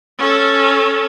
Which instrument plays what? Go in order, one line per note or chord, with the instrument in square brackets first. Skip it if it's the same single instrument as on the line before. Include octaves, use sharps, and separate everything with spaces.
[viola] C#4 A4